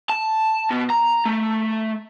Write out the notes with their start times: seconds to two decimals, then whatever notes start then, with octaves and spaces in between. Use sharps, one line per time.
0.09 A5
0.71 B2
0.90 A#5
1.25 A3